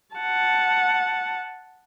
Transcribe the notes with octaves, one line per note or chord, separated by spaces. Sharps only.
F#5 A5